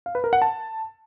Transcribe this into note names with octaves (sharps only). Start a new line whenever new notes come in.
F5
B4
A#4
F#5
A5